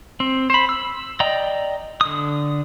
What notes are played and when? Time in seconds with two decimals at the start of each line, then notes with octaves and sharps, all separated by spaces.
0.20 C4
0.50 C5 B5
0.69 E6
1.20 D5 D#5 G5 A#5
2.01 D3 D#6